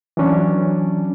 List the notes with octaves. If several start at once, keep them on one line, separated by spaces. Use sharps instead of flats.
E3 F#3 C#4 D4